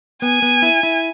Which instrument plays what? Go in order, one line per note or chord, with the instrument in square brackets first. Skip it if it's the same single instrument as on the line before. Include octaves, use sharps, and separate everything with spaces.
[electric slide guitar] B3 [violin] G#5
[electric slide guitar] B3
E4
E4